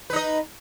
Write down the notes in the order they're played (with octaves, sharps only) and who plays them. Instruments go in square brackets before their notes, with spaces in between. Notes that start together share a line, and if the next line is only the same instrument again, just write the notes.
[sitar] B4
D#4
D#5